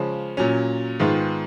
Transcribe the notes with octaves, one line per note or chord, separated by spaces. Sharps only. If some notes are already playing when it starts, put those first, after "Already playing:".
Already playing: C#3 F3 G#3 C#4
A#2 F#3 C#4
G#2 D#3 G#3 B3 F4